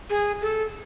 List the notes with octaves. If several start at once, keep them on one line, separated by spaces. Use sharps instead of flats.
G#4
A4